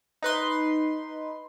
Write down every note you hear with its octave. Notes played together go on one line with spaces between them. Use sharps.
D#4 B4 C6